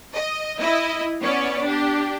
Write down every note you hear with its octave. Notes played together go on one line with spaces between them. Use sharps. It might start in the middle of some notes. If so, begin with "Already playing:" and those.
D#5
E4 D#5 E5
B3 C#4 C#5 D5
D4 G4